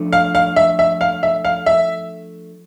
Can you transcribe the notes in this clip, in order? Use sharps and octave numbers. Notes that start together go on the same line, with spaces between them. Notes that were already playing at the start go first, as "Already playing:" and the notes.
Already playing: F3 A3 D4
F5
F5
E5
E5
F5
E5
F5
E5